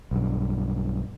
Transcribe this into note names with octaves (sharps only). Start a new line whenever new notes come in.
B1 G2